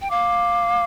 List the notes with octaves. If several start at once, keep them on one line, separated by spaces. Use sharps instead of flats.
G5
F5 D6